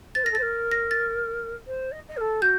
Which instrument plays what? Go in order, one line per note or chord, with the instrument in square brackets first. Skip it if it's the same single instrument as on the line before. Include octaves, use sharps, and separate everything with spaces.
[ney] C5 [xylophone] A6
[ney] A#4
[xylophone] A#6
[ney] A4
[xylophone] A6
[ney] C5
A#4
[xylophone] A#6
A6
[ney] C5
D#5
D#5
A#4
A4
[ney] F#4 [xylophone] G6